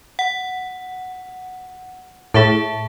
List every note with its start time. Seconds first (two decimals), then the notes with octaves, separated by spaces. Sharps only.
0.19 F#5
2.34 A2 G#4 E5 A5